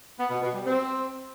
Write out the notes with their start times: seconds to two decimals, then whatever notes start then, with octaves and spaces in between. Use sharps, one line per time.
0.19 B3
0.30 B2
0.42 B2
0.53 G3
0.65 C4